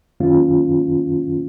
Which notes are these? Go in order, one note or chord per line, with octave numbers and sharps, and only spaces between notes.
F#2 D#3 A#3 C#4 F4